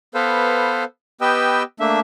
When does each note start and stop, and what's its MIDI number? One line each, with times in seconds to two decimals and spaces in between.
0.15 0.84 59
0.15 0.84 69
0.15 0.84 71
0.15 0.84 72
0.15 0.84 77
1.21 1.63 59
1.21 1.63 67
1.21 1.63 71
1.21 1.63 75
1.21 1.63 79
1.21 1.63 88
1.80 2.00 57
1.80 2.00 58
1.80 2.00 62
1.80 2.00 76